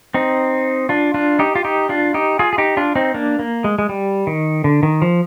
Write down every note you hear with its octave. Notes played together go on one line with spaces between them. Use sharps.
C4 D#4
D4 F4
D4 F4
D#4 G4
F4
D#4 G4
D4 F4
D#4 G4
F4 G#4
G#4
D#4 G4
D4 F4
C4 D#4
A#3 D4
A#3
G#3
G#3
G3
D#3
D3
D#3
F3